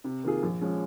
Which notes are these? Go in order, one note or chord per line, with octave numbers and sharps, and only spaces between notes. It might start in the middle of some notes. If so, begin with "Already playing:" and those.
C3
D#3 A#3 F4 G#4
A#1
F3 G#3 C#4